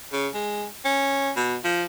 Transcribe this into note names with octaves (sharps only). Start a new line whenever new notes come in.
C#3
G#3
C#4
B2
F3